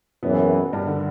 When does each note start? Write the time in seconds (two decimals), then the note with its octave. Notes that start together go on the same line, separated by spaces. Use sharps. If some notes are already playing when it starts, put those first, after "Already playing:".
0.23 F#1 F#2 B2 E3 B3
0.73 G2 G3
0.87 D3